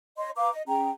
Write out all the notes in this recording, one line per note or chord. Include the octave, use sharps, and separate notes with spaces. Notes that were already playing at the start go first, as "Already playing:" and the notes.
C#5 D#5 C6
B4 F5 A#5 D6
D#5
C#4 G#4 G5 A#5